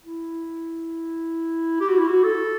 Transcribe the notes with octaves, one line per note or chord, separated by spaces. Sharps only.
E4
G4
F#4
E4
F#4
A4